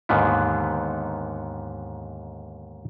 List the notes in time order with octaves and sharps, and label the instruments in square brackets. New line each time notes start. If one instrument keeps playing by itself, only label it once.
[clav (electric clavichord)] D#2 G#2 D3 D#3 B3